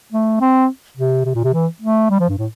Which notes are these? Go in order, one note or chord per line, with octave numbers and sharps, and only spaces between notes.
A3
C4
C3
C3
A#2
C3
E3
A3
G3
F3
G2
A2